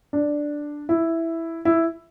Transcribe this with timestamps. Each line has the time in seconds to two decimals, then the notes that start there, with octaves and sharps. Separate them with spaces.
0.13 D4
0.89 E4
1.65 E4